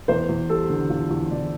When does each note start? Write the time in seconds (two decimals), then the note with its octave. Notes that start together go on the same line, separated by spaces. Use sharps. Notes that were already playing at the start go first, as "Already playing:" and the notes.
0.08 E2 C5
0.29 E2
0.49 G3 A4
0.70 D3
0.90 E2 F4
1.11 E2
1.30 E2 D5